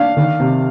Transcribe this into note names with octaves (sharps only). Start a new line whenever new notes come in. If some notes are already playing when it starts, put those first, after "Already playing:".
Already playing: D4 F5
D#3
C3